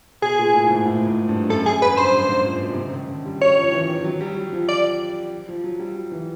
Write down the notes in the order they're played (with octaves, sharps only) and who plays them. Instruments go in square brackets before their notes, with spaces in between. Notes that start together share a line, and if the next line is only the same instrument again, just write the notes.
[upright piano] B2 [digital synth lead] G#4
[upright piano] A#2
A2
A2
G#2
A2
G#2
G2
[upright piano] F#2 [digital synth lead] A4
[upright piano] F#2 [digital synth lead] G#4
[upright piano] F#2 [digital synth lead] B4
[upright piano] G2 [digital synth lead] C5
[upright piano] G#2
G#2
A#2
B2
C3
C#3
D#3
D3
G3
[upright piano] F#3 [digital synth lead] C#5
[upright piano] F3
E3
D#3
F#3
G3
F#3
F3
[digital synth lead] D5
[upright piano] F3
F#3
G3
F#3
E3